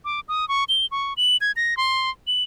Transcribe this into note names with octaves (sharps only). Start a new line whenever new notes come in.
D6
D#6
C#6
G7
C#6
F#7
G#6
A#6
C6
F#7